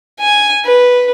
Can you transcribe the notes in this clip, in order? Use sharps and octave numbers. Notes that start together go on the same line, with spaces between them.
G#5
B4